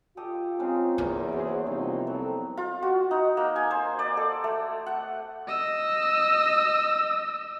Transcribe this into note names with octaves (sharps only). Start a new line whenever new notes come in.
F4 G4 A4 D#5
G#3 C4 C#4 D#4
E2 A#3 B3 F#4
F#4 G#4 C5 C#5
C2 F3 C4 D#4
F#3 C4 A4
F4
F#4
D#4
A#3
G#5
C5
D5
A4
A3
F#5
D#5 E6